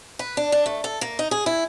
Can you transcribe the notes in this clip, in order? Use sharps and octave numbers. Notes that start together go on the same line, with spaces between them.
B4
D4
D4
A3
A4
A#3
D#4
G#4
E4